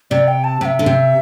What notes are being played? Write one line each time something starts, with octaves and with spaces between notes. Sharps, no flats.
C3 D5
G5
A5
C3 E5 G5
D3
C3